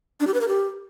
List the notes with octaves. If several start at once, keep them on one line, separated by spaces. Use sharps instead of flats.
D4
G4
B4
A#4
G4